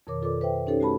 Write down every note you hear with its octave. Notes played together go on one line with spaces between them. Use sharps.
F2 B2 D#3 A#4 C#5 D6
F4 A4 B4 D5 D6
B4 C5 E5 G5
C#4 D#4 G4 A4 B4 C#5
A3 F#4 A5 B5